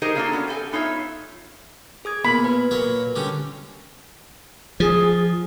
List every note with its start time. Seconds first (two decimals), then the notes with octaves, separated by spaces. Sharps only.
0.02 D#4 G4 G#4 A#4 C5 D#5
0.15 A3 A#3 D4 F#4 G#4 A4
0.32 B3 C#4 F#4
0.48 G4 A4 E5 G#5
0.72 B3 D#4 F4 C#5 E5
2.05 G#4 D#6 G#6
2.25 A#2 B3 B5
2.44 B4
2.71 A#2 F#3 C#5
3.16 D3 G3 C#4
4.80 F3 G#4